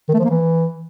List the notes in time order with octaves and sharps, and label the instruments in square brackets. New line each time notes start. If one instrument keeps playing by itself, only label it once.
[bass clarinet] D#3
A3
F3
A#3
E3